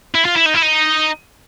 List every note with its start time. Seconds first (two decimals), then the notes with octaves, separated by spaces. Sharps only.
0.14 E4
0.25 F4
0.36 E4
0.46 D#4
0.54 E4
0.62 D#4